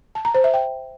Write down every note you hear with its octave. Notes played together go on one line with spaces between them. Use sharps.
A5
A#5
C5
E5
G5